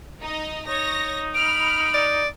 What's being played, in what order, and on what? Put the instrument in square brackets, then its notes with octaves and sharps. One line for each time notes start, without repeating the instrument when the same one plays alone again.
[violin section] D#4 D#5
[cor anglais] D#4 [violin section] C#5 A#6
[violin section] B5 F6 [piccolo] D7
[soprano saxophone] D5